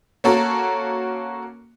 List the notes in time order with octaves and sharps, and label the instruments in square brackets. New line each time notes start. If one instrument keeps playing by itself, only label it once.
[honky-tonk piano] A#3 C#4 F#4 A4 A#4